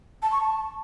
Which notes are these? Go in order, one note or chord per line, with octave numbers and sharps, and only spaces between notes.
A5
C#6
A5